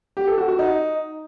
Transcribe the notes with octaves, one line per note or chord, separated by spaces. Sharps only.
G4
A4
F#4
F#4
D#4